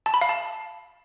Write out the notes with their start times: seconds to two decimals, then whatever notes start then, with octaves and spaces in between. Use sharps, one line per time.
0.06 A5
0.14 B5
0.21 F5
0.29 A5